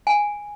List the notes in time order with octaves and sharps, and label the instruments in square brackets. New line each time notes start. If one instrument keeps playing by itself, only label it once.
[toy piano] G#5